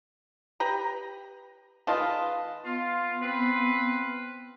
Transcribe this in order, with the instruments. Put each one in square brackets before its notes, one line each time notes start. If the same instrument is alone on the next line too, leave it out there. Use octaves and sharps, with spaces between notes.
[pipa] G4 B4 A#5
[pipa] D#3 G#3 F4 [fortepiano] B4 D#5 A5
[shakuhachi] B3 [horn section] F4
[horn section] C4 F4 B4